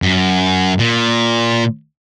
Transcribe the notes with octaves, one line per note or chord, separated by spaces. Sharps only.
F#2
A#2